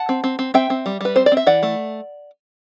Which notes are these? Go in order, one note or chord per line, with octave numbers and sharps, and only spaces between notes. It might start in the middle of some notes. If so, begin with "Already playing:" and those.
Already playing: F#5 A5
C4
C4
C4
C4 E5 G5
C4
G3
G3 B4
C4 C5
D5
C4
E5
E3 D5 F#5
A3